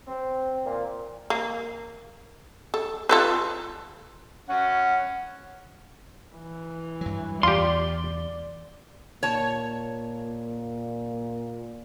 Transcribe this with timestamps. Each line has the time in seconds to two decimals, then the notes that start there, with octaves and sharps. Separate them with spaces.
0.07 C4
0.65 A#2
1.30 A#3
2.74 A4
3.09 F4 A4 B4
4.49 C#4 F#5
6.37 E3
7.01 G2 F#3
7.43 E2 F4 G4 D5 C6
9.23 A#2 C#5 A5